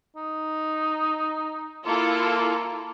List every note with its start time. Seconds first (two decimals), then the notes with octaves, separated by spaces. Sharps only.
0.17 D#4
1.87 A#3 E4 F4 A4